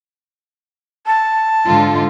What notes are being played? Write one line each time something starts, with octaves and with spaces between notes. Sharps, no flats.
A5
G#2 D3 F4